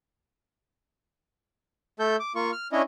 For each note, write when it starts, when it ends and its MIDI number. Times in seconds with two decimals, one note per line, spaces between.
2.00 2.16 57
2.00 2.16 69
2.00 2.16 91
2.20 2.32 86
2.35 2.51 58
2.35 2.51 65
2.35 2.51 85
2.52 2.68 89
2.72 2.82 61
2.72 2.82 62
2.72 2.82 64
2.72 2.82 73
2.72 2.82 75